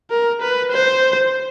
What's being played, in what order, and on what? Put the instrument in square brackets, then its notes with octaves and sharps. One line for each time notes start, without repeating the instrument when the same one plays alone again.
[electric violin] A#4
B4
C5